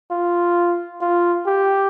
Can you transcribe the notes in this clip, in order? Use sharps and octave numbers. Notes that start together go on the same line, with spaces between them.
F4
F4
G4